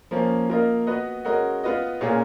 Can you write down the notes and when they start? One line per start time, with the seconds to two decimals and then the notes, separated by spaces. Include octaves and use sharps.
0.11 F3 A#3 C#4
0.49 A#3 F4 A#4 D#5
0.87 B3 F#4 B4 D#5
1.25 G#3 C#4 F#4 A#4 D#5
1.64 B3 F4 B4 D#5
2.01 A#2 G#3 C#4 F4 G#4